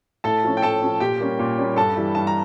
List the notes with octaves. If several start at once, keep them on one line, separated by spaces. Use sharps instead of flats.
A2 A4 A5
F3 C#4
G5
A2 A4 A5
F3 C#4
A#2 G4 G5
G3 A#3 C#4
A#2
G3 A#3 C#4
G2 A4 A5
E3 G3
G2 A5
A#5